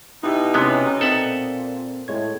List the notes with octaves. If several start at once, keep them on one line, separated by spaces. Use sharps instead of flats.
B2 D#4 E4 G4 E5
C3 G#3 B3 C#4
A#2 C4 A4 E5 F#5
A2 G#3 C#5 G#6